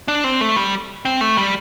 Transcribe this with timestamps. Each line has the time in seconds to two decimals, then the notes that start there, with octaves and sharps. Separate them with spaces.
0.08 D4
0.24 C4
0.41 A3
0.56 G3
1.05 C4
1.21 A3
1.37 G3